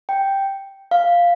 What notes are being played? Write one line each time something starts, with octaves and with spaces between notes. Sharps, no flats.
G5
F5